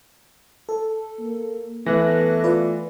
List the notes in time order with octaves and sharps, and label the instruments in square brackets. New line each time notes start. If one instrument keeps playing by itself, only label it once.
[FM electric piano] A4
[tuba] A#3
[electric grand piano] E3 [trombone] A3 [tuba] B3 [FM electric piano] F#6 A#6
[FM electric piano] F4 B4 D5